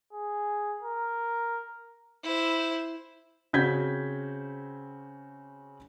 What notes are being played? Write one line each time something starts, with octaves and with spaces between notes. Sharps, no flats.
G#4
A#4
E4 C5
C#3 C4 F#4 G6 G#6 B6